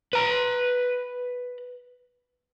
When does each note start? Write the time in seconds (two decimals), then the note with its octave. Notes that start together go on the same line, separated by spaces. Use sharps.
0.13 B4 A#5